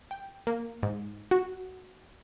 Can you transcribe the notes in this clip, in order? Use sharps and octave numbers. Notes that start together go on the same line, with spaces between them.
G5
A#3
G#2
F#4